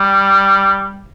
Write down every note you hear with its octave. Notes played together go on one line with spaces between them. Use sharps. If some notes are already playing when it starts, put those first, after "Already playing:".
Already playing: G3